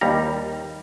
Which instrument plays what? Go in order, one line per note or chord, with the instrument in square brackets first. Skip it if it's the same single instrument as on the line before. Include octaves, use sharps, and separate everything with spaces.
[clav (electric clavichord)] D#2 G3 A#5